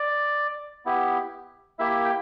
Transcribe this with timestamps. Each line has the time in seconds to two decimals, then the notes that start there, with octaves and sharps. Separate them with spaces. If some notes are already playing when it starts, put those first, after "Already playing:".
Already playing: D5
0.85 B3 E4 G4
1.79 A#3 E4 G4 E5
2.05 G5